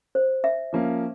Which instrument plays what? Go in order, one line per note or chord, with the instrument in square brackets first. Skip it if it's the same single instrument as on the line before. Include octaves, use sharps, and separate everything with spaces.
[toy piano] C5
E5
[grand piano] F3 A#3 C#4